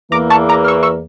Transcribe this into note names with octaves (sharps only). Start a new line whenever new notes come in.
E2 E3 A#3 A#5 D6
A5 C#6
A#5 D6
F6
C#6 E6
C#6 E6